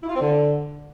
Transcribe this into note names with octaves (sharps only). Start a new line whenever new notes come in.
E4
F4
C4
D3